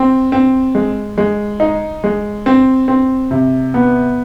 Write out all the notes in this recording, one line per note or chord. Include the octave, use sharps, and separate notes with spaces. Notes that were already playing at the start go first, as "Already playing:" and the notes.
Already playing: C4
C4
G#3
G#3
D#4
G#3
C4
C4
C3
B3